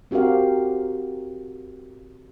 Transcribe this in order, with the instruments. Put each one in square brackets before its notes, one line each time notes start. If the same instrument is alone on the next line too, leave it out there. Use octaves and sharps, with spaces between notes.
[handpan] C4 F#4 G4 A#4 F5